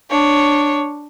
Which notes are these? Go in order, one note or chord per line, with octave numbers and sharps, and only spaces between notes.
D4 C#5